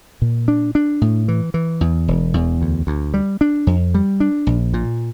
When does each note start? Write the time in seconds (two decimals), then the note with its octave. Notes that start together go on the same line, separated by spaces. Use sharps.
0.22 A#2
0.48 D4
0.75 D4
1.01 A2
1.28 E3
1.54 E3
1.81 E2
2.08 E1
2.34 E2
2.62 D2
2.87 D2
3.14 G3
3.41 D4
3.67 F2
3.94 G3
4.20 D4
4.47 A#1
4.74 A#2